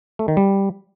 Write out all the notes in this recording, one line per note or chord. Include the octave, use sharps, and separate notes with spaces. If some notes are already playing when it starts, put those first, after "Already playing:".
A3
D#3
G3